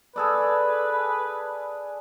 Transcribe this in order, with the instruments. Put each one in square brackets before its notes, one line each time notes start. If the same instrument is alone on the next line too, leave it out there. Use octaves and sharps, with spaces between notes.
[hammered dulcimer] G#4 A4 D5 [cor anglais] B4